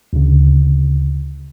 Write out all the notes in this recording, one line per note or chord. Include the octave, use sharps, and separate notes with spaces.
D2 C#3